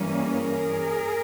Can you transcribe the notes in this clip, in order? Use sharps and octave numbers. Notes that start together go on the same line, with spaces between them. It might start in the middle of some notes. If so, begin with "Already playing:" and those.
Already playing: G2 E3 G3 A#3 C#4
G#4 A#4